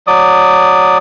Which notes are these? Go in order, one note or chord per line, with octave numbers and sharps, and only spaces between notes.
F#3 D5 D#6